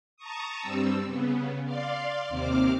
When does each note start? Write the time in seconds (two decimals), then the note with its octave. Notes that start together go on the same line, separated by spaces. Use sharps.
0.17 A5 A#5 C#6 D#6
0.61 G2 G3 C4 E6
1.06 C#3 B3
1.65 D5 F5 C6
2.29 D#2 C3 C4 D6 F6